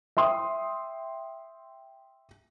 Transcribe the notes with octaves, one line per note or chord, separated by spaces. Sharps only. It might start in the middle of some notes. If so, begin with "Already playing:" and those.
E5 G5 C6 D#6